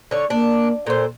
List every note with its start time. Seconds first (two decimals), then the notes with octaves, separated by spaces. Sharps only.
0.11 D3 C#5
0.30 A#3 D4
0.87 A#2 A4 C5